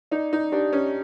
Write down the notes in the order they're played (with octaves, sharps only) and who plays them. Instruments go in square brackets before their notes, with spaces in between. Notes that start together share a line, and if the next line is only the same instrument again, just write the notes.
[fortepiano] D#4 [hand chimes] D5
[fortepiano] D#4
[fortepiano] D4 [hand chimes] G4
[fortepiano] C#4